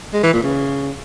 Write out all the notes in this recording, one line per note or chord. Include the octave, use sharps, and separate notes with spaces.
G#3
E3
A#2
C#3